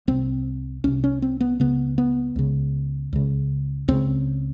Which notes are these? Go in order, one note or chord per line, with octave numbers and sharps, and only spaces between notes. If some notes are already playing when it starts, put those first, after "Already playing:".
C2 C3 C4
C2 C3 C#4
C#4
C4
B3
C#2 C#3 B3
B3
C#2 C#3
C#2 C#3
C#2 C#3 C4